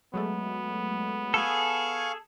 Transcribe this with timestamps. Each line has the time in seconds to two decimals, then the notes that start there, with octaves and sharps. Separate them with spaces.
0.14 F#3 G#3 A3 B3
1.34 G#4 A4 F5 G#5 C#6